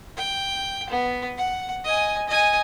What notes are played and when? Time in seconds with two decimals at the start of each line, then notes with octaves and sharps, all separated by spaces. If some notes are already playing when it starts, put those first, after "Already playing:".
0.17 G5
0.90 B3
1.38 F#5
1.84 D#5 G#5
2.28 D#5 G#5